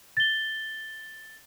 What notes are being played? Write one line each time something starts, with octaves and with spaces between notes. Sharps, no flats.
A6 G7